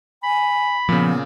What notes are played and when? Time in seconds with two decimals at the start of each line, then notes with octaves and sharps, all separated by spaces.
0.23 G#5 B5
0.89 A#2 C#3 F3 B3